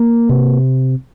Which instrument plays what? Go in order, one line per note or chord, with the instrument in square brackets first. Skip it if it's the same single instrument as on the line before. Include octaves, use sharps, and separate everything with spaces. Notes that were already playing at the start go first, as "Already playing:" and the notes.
Already playing: [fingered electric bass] A#3
C3